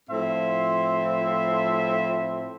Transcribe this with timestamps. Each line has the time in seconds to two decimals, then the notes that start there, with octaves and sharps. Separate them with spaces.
0.10 A2 F3 C4 E5 C6